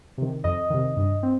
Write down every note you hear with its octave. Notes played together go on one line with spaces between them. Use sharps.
C3 D#3
F2 D#5
C3 D#3
G2
C4